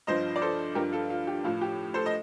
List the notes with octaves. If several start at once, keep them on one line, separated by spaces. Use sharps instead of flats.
G2 F3 C5 D#5
D5
A4 C5
G2 F3 G4 A#4
F4 A4
F4
G4
A2 F3 F4
G4
A4 C5
D#5